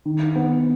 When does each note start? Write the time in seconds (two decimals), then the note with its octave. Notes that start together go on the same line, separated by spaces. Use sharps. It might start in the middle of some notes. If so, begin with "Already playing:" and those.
0.05 D#3
0.35 B3